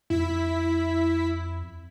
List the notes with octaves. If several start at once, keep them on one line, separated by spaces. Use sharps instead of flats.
F2 E4 B6